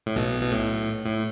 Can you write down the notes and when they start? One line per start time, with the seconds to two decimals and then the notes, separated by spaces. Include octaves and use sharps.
0.06 A2
0.16 B1 B2
0.42 B2
0.52 A2
1.05 A2